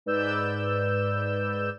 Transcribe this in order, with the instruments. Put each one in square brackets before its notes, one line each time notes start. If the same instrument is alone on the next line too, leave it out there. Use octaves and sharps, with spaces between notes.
[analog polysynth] G#2 B4 D5 E6 G6 E7